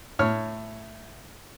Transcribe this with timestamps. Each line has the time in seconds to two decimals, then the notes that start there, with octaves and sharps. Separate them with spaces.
0.19 A2 C#5 F6